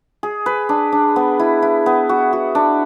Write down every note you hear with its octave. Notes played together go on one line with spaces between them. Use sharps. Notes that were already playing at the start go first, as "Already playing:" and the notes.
G#4
B4
D4
D4
B3
E4
E4
B3
F#4
F#4
D4